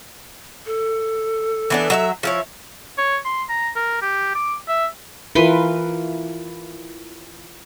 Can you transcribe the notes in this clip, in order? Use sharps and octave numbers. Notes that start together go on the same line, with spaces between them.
A4
E3 B3 D4
F#3 D#5 E5
F3 E4 C#5 E5
C#5
C6
A#5
A#4
G4
D6
E5
E3 E4 F4 A#4 B4 C6